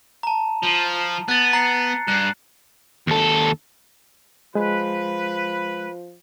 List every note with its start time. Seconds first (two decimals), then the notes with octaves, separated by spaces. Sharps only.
0.23 A5 A#5
0.63 F3
1.28 B3 F#6 A6
1.53 A#5 C7 C#7
2.08 G2 F#6 C7
3.07 D#2 A4
4.55 F3 G#3 B4